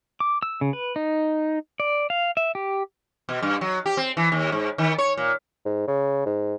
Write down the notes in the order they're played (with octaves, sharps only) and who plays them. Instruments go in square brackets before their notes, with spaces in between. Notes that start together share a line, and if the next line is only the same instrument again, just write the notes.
[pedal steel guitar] D6
E6
C#3
B4
D#4
D5
F5
E5
G4
[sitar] B2
G2
F#3
G4
C4
E3
D#2
G#2
D#3
C#5
A#2
[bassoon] G#2
C#3
G#2